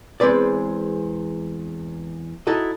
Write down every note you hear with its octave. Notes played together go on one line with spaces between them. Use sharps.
E2 G#3 C4 B4 D5
D#4 E4 F#4 A4 D#5